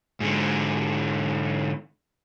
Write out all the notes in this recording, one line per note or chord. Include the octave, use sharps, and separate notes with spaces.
G#2 D3